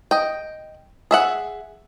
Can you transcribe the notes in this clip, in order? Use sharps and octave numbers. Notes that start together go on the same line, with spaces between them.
D#5 G5
G#4 E5 F#5